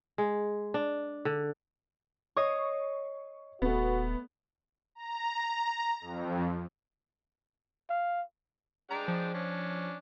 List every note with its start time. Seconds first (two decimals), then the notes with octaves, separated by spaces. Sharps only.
0.18 G#3
0.74 D4
1.25 D3
2.37 C#5 D#5 C#6 D#6 C7
3.62 D#1 A3 B3 F#4
4.95 A#5
6.01 F2
7.90 F5
8.90 G#3 D4 G5 A#5
9.08 F3
9.34 C#4 D4